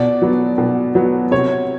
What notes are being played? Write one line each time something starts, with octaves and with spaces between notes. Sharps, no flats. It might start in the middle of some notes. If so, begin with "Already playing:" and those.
Already playing: B2 D5
F#3 B3
B2
F#3 B3
C3 C#5